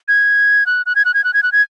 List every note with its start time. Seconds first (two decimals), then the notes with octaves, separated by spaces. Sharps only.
0.08 G#6
0.66 F#6
0.86 F#6
0.95 G#6
1.05 F#6
1.14 G#6
1.24 F#6
1.34 G#6
1.43 F#6
1.52 G#6